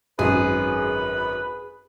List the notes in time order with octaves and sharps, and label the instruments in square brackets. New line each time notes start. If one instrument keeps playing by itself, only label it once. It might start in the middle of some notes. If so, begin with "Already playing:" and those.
[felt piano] G#1 F#2 [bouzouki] G#4 [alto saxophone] B4